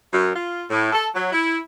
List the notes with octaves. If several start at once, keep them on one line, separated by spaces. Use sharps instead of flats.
F#2
F4
A2
A4
F#3
E4